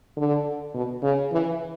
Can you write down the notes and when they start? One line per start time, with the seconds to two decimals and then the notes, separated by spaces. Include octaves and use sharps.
0.17 D3
0.74 B2
1.03 C#3
1.32 E3